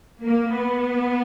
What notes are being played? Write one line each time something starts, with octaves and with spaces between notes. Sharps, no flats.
A#3
B3